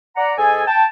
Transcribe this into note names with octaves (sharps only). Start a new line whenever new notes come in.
D5 F#5 A#5
G#2 G#4 A4 D#5 G#5
G5 A5